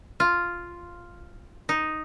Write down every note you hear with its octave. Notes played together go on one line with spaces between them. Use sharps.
F4
D#4